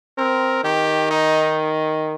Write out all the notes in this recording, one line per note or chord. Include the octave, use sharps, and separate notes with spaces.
C4 A#4
D#3 G4
D#4